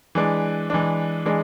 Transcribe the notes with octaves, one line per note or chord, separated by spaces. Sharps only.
E3 G#3 D4
E3 G#3 D4
E3 G#3 D4